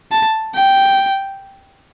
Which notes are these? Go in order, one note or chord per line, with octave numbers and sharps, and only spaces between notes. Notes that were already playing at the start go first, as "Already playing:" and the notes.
A5
G5